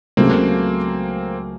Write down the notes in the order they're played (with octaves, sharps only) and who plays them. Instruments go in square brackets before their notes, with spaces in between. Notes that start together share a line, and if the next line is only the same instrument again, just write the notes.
[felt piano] C#2 C#3 F#3 A3 [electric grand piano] A#3 C4